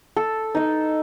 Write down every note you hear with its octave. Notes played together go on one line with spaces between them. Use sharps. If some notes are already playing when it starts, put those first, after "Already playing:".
A4
D#4 D#5